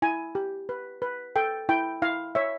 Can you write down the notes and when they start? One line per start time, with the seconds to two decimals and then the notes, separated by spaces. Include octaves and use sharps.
0.02 E4 G#5
0.35 G4
0.69 B4
1.02 B4
1.36 A4 G5
1.69 E4 G5
2.02 E4 F5
2.35 C#5 E5